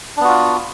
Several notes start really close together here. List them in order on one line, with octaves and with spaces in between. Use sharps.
D4 B3 F#4 F4